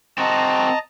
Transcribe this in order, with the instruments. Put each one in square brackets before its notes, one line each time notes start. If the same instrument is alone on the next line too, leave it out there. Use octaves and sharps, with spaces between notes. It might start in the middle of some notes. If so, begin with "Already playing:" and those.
[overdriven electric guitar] C4 F#4 [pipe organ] D#5 A5 A#5